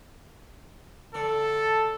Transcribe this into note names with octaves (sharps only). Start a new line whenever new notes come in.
D3 A4